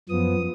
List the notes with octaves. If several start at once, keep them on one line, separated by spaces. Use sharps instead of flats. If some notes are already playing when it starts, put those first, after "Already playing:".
F#2 F3 B3 D#6